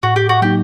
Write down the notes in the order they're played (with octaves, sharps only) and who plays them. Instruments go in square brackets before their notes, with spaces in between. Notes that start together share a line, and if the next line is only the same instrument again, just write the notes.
[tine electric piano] A2 [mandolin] F#4
[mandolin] G4
F#4
[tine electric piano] F#3 A#3 D#4 [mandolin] G4